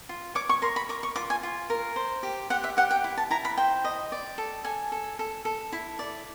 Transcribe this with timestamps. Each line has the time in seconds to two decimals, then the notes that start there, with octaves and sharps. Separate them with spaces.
0.09 F4
0.35 C#5 D6
0.49 C#6
0.62 A#4 C6
0.76 B5
0.89 A#4 D6
1.03 C#6
1.16 F4 D6
1.30 G#5
1.43 F4
1.70 A#4
1.96 C5
2.23 G4
2.50 G4 F#5
2.64 E5
2.77 G4 F#5
2.91 G5
3.04 E4
3.17 A5
3.30 E4 A#5
3.45 B5
3.57 C5 G5
3.84 D#5
4.12 D5
4.38 A4
4.65 A4 G#5
4.92 A4
5.19 A4
5.45 A4
5.72 E4
5.99 D5